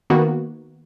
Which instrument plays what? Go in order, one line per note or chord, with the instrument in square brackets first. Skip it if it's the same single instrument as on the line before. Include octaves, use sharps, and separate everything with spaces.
[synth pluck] D#3 A#3 B3 F#4